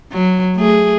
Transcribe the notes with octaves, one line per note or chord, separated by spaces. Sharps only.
F#3
A3 G#4